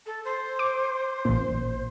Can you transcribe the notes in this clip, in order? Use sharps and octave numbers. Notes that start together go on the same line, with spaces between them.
A4
C5
D6
A1 A#2